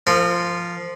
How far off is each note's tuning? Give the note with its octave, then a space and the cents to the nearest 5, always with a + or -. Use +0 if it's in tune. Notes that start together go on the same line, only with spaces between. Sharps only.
F3 -5 A#4 -40